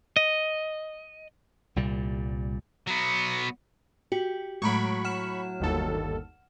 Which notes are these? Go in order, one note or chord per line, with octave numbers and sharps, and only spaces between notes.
D#5
C2 A#2 G3
F#3 B3
F#4 G4
A2 F#3 G#3 A#5 B5 C#6 D7
F#5 F6 E7
G1 D#2 A4